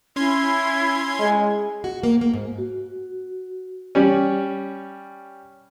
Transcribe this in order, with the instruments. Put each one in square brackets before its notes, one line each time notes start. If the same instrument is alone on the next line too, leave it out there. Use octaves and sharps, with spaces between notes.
[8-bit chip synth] C#4 C6 G#6 [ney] E4
[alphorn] G#3
[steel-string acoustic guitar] F#4
A#3
A#3
G#2
[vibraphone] F#4
[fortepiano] G3 C#4